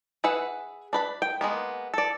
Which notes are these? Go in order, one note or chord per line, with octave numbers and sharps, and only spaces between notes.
G#4 B4 E5 F#5
D4 B4 B5
G5
G#3 A#3 B3
A4 D5